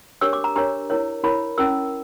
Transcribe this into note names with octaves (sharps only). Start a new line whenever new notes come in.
D4 G4 A#4 C#5 E6
D6
A#5
D4 G4 A#4 C#5 A#5
E4 A#4 C#5
E4 A#4 C#5 B5
C#4 E4 A#4 E6